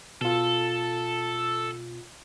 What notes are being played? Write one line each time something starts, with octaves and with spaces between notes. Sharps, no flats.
B2 F4 A4